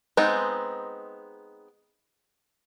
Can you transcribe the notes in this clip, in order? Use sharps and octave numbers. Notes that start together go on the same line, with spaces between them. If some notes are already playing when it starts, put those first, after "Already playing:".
G#3 B3 C4 D#4